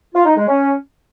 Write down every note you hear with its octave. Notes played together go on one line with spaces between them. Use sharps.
F4
D#4
G#3
C#4